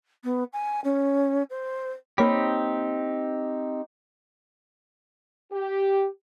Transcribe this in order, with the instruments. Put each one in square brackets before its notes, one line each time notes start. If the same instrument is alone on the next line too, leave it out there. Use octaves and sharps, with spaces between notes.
[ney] B3
G#5
C#4
C5
[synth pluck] A#3 C#5 B5 [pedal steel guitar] C4 D#4 G4
[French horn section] G4